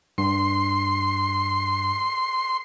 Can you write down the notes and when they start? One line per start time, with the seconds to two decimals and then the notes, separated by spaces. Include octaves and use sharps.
0.18 G2 C6